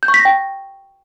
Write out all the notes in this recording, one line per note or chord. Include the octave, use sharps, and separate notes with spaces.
G6
C#6
B6
A#6
G5